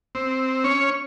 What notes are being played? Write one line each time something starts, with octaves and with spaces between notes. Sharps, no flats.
C4
C#4 C#5